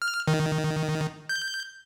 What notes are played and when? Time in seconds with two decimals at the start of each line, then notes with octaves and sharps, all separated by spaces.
0.02 F6
0.28 D#3
1.29 G6